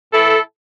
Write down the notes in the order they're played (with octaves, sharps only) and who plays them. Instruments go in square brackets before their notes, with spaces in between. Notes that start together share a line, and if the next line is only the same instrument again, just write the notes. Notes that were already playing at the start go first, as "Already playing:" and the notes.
[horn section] A2 E3 E4 A4